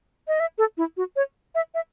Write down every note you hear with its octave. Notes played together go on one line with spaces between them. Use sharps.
D#5
E5
A4
E4
F#4
C#5
E5
E5